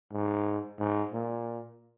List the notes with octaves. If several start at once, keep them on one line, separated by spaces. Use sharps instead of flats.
G#2
G#2
A#2